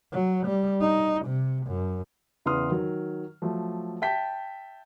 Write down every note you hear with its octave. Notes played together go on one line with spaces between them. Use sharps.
F#3
G3
D#4
C3
F#2
E2 C#3 E3 C6 D#6 F6
D#3 F#3
F3 F#3 A3
E5 G5 A5 G6 B6